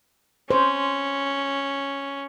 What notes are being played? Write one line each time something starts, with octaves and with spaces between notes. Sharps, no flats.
C#4 C5